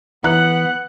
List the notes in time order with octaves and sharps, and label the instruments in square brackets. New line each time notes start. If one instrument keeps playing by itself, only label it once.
[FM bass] E3 [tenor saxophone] B3 [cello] F#5 [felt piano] F#6